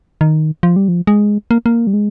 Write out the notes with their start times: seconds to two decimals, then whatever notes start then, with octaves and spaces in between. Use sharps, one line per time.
0.21 D#3
0.63 F3
0.76 G3
0.88 F3
1.07 G#3
1.51 A#3
1.66 A#3
1.87 G3
1.93 G#3